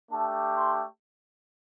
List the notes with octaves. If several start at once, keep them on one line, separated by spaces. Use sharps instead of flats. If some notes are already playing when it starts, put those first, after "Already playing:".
A3 D4 G4 A5
C6